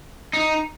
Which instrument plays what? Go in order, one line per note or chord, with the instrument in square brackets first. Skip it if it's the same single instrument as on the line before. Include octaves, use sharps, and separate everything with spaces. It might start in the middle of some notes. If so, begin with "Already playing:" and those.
[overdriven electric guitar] D#4